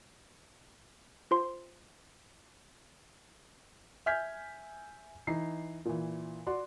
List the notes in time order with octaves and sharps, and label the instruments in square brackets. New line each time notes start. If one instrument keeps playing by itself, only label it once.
[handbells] F4 C5 C6
[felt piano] E5 G#5 F6 G6 G#6 B6
E3 D#4 C7
A#2 E3
F#4 D5 C6